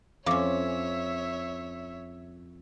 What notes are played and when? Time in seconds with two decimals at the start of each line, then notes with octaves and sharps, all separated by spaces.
0.26 F2 C#4 C#5 E5 F5 D6